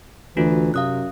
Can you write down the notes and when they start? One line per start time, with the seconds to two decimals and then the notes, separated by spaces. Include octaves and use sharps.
0.37 D2 E3 F4 F#4
0.74 F#2 C3 F5 D#6 F#6